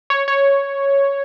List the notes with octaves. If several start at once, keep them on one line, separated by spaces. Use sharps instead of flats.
C#5
C#5